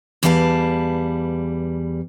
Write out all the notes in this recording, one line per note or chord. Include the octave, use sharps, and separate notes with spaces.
E2 G3 B4 F5 G#5 A5